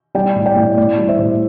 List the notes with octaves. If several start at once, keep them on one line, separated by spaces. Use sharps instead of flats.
G3 D5 G5
A2
D5 G5
A2
A2 D5
G3
C5 E5
A2